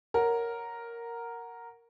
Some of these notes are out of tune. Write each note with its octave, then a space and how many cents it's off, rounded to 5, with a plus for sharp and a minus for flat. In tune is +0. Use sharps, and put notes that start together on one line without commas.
A#4 +0 C#5 +0 F#5 +0